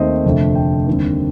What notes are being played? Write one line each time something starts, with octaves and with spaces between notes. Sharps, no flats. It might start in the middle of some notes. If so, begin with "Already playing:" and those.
Already playing: D#2 D#3 A3 C4 C5 D#5
F1 F2 D3 A3
G5
D#2 D3 G3 C4